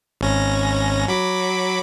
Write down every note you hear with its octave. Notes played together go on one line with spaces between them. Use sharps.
G#1 C#4 A#6
F#3 B5 D6